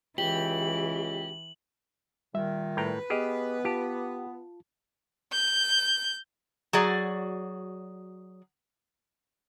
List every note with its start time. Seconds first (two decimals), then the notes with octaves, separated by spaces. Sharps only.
0.18 C#2 E3 G4 F#7
2.34 A#2 D#3 G3 E5
2.77 A2 B4 G5 A#5
3.10 B3 G4 G#4 D#5 G#5 F6
3.65 F4 G4 A5
5.32 G6
6.73 F#3 F#4 G#4 D5